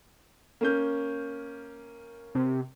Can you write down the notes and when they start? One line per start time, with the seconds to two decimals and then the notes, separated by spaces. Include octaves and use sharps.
0.61 A#3 C#4 G6
2.35 C3